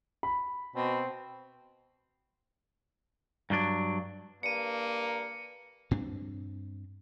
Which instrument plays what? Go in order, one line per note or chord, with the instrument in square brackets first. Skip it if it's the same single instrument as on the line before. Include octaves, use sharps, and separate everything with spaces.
[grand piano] B5
[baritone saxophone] B2 [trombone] C4
[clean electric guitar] G2 F#3 D4
[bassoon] G2 [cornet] A#3 [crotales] C#7 D#7
[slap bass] G2 C4 D4